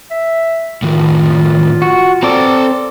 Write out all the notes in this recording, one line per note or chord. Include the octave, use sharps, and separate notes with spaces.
E5
A2 D#3 F4
F#4
C4 A4 D5 A5 A#5